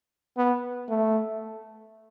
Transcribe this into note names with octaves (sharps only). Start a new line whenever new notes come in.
B3
A3